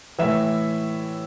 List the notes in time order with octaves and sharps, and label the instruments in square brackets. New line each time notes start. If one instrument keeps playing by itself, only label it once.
[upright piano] A2 E3 E5